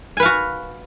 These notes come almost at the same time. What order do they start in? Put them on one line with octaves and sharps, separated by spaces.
G#5 B4 F5 F#4